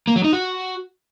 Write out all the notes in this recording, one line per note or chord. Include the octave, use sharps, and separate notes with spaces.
A#3
F#3
D#4
F#4